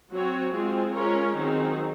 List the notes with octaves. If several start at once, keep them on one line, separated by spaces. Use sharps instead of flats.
F#3 C4 F#4 C#5
G#3 C4 F4 G#4
G#3 C#4 F4 A#4 C#5
D#3 F#3 C4 D#4 G#4